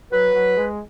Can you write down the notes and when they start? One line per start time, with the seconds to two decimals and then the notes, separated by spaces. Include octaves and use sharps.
0.12 F#3 B4
0.34 F#3
0.56 G#3